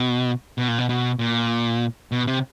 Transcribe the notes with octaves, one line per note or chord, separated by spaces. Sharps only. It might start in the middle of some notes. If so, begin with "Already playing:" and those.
Already playing: B2
B2
A#2
B2
B2
A#2
B2
C3